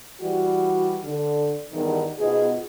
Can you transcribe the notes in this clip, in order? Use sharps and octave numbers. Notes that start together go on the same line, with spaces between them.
E3 G3 F#4
D3
E2 G2 D#3
G#2 B2 B3 F4 G#4 D#5